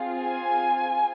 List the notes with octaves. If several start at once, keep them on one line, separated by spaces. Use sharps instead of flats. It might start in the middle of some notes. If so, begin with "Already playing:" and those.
Already playing: C4 F4 G#4
G#5